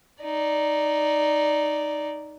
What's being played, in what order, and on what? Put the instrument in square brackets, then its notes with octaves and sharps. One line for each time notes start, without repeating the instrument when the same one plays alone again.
[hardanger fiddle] D#4 D5